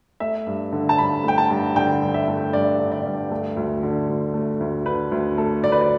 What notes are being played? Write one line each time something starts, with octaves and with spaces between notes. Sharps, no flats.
A3 E5
G2
D3
A5
G2 B5
A3 G5
A5
G2
D3 G5
G2
E5
A3
G2 D5
D3
D5
G2
A3
D2
D3
D2
A3
D2
D3 B4
D2
A3 A4
D2 D5
B4
D5